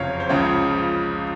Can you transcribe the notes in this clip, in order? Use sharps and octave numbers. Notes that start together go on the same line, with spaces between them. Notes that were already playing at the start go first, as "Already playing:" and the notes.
Already playing: F#1 F2 C3 C#5 F5
C5
C#2 C#3 F3 C#5